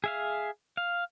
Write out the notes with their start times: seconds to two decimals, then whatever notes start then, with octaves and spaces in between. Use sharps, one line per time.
0.04 G#4 E5 F5
0.77 F5